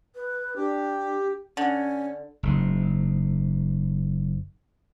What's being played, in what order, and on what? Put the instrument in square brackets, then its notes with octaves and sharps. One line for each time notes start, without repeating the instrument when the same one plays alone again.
[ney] B4
[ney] D4 [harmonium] G4
[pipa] D3 [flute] C#4
[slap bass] F#1 G#2